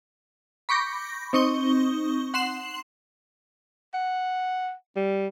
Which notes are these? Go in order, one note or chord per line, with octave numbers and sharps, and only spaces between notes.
B5 C#6 D6 G6 A#6
C4 D#4 C#6 D#6 G7
F#5 C6 C7 E7 F#7
F#5
G3